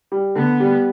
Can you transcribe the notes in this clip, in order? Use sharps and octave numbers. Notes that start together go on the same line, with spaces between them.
G3
D3 B3
G3